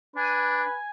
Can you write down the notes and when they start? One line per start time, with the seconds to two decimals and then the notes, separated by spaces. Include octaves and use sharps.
0.16 D4 B4 G#5